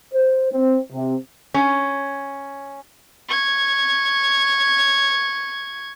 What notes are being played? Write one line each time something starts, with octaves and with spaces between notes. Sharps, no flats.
C5
C4
C3
C#4
C#6 G#6